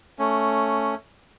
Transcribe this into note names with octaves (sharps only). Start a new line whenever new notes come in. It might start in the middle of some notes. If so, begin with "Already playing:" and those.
A3 C#4